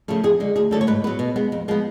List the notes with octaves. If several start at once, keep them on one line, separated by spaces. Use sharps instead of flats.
C#3 F3 A3
F2 G#4
D3 G#3
D2 G#4
D3 F#3 A3 A4
C#5
G#2 B4
F#3 B3 B4
B2
G#3 B3
F2
F3 G#3 B3